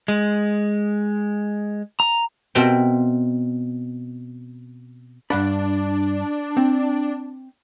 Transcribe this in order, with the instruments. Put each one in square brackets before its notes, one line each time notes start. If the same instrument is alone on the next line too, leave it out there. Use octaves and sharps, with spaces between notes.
[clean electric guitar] G#3
A#5
[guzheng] B2 C4 A#4 E5 G5
[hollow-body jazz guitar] G2 F#5 B5 [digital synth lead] D4
[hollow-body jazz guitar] C4